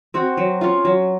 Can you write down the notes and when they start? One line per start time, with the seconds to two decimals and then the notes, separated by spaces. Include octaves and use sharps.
0.14 C4 F#4
0.37 F#3
0.61 C#4 F4
0.85 F#3